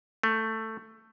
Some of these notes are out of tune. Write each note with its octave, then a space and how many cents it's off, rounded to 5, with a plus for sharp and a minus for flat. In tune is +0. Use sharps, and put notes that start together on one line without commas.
A3 +10